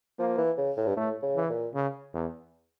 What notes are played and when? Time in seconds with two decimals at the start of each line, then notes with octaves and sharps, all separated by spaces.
0.19 F3 A#3
0.38 E3
0.58 C#3
0.77 A2
0.87 G2
0.96 A2 A3
1.23 C#3
1.36 E3
1.50 A#2
1.75 C#3
2.14 E2